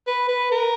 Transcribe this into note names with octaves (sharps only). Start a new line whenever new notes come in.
B4
B4
A#4